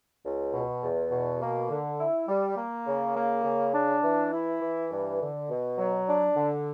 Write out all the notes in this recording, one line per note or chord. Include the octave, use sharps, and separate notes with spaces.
C#2
B2
E2
B2
A#3
D3
E4
G3
A#3
C#3
A#3
C#3
D4
E3
E4
E3
G2
D3
B2
F#3
D4
D3